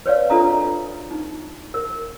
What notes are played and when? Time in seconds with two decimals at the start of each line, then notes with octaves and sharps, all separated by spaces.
0.06 B4 C#5 D5 F5
0.30 D4 F4 A4 D#5 A#5
1.11 D#4
1.74 A#4